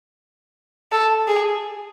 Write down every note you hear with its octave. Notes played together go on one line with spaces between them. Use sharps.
A4
G#4